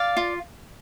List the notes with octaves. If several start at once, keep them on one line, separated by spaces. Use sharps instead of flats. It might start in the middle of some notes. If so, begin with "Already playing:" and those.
Already playing: D5 F5
F4